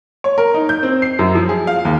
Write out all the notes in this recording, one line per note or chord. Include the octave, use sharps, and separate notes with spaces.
C#5
A#4
D#4
G6
C4
C7
F#2
F3
G#4
F5
D#2